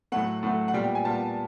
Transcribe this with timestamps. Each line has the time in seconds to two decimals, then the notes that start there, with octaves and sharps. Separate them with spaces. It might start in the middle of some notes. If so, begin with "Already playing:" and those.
0.12 A2 F#3 A3 F#5
0.43 A2 F#3 A3
0.68 F#5
0.73 A#2 G3 B3 G5
0.84 G5
0.95 G#5
1.05 A#2 G3 B3 A5